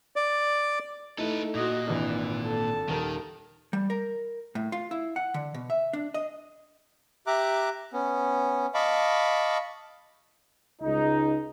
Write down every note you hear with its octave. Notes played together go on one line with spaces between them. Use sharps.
D5
A3 D#4 E4 A4 B4
A#2 F#4 D#5
G#1 E3 D4
A4 A5
D#1 D#3 A#4
G3
A#4
A2
F4
E4
F#5
D3
B2
E5
D4
D#5
G4 E5 A#5 D6 F#6
B3 C#4
D#5 F5 A5 B5 C#6 D6
C#2 G#3 D#4